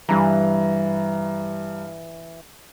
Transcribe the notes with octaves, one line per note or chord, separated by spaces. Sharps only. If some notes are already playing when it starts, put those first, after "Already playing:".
G2 E3 A#5